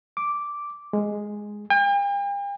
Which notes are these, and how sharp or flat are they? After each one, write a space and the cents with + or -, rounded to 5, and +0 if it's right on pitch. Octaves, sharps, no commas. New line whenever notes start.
D6 -5
G#3 +0
G5 +45